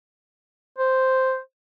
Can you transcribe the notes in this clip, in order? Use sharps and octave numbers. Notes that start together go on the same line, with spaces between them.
C5